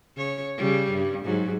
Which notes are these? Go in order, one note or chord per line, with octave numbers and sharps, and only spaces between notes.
C#3 C#5
C#3 G3
G2
G#2 F#3